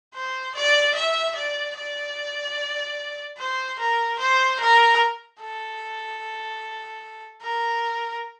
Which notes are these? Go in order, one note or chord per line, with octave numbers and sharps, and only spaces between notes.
C5
D5
E5
D5
D5
C5
A#4
C5
A#4
A4
A#4